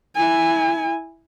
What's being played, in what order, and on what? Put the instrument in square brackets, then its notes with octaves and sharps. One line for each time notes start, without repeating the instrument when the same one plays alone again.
[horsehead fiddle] E4 G#5